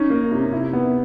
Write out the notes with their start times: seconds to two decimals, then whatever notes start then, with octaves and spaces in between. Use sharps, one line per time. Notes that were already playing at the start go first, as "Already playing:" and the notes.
Already playing: C#4 D#4
0.10 A#3
0.32 C3
0.53 E4
0.73 B3